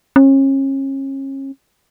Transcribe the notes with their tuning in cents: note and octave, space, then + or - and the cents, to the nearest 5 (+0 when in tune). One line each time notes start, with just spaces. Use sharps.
C#4 -35